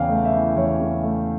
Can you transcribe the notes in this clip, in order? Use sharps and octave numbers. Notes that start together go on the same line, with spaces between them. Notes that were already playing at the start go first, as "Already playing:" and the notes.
Already playing: E2 C#3 F5 G5
A3
E5
E3
E2 C#5
C#3
A3